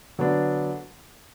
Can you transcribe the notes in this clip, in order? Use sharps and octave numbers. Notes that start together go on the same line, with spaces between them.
D3 F#3 B3 D4